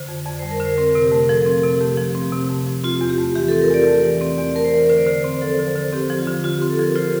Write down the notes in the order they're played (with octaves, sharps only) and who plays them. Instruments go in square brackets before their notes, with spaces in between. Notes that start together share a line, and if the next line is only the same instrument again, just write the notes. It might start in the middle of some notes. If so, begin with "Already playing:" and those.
Already playing: [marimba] D3 [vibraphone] C5
[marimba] F2
[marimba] F2 [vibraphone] D5
[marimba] G3 [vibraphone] C5
[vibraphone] A#4
[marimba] D3 [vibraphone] C5
[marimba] C4 [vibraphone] A#4
[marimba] C3
[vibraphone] G4
[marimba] A3
[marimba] F3 [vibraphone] A4
[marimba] C4
C3
[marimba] A3 [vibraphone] G4
[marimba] F3
C4
C3
A3
F3
[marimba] C4 [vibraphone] F4
[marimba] E2
[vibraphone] G4
[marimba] A3
[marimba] E3 [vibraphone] G4
[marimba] C4 [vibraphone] A4
[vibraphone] A#4
[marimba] E2 [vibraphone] D5
[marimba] A3
E3
C4
[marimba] E2 [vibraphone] D5
[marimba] A3 [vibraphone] A#4
[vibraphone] C5
[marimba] E3
[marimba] D3 [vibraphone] C5
[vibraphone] D5
[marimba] D3 [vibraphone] C5
[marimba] C4
[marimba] F3 [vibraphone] A4
[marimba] D3
D3
[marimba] C4 [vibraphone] G4
[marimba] F3
[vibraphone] F4
[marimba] D3
[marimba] D3 [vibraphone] F4
[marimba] C4 [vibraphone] G4
[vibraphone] A4
[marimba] F3 [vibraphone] A#4
[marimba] F4 [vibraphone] C5